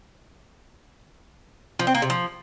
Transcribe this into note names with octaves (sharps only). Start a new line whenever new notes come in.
F3
C4
A#3
C3
F3